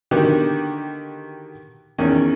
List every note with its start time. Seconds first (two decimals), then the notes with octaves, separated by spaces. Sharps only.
0.11 D3 D#3 A#3 B3 F#4 G4
1.98 E2 D#3 C#4